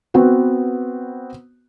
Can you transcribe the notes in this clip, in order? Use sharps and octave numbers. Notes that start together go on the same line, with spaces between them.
B3 C4 F#4 B4